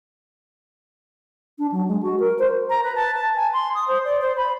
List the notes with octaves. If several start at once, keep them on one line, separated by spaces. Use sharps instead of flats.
D4
F#3
G#3
F#4
A#4
C5
A#5
B4
A5
A5
G#5
C6
D#6
C5
D5
C5
B5